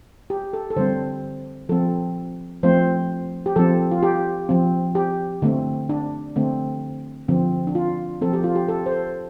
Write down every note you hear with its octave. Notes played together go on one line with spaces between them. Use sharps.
G4
A4
A4
D3 G3 C4 C5
F3 C4 A4
F3 A3 C4 C5
G4
F3 C4 A4
F4
G4
F3 C4
G4
D3 A3 C4
D4
D3 A3 C4
D3 F3 C4
D4
F4
F3 C4 A4
G4
F4
G4
A4
C5
A4